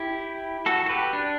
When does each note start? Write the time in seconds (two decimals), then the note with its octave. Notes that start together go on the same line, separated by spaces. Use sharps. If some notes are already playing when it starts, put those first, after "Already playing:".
Already playing: E4 G4
0.66 F#4 A4
0.86 A4
0.89 G4 B4
1.13 D4